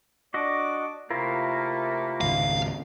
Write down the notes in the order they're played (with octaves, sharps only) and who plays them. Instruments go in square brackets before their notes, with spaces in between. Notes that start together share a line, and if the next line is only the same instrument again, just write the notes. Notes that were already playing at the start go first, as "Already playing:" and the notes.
[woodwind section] D4 D5 D6 [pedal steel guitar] F#4 D#5
[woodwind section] C3 A3 A#3 [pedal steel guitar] E4 F4 A#4
[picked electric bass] G#1 C#2 [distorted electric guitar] F5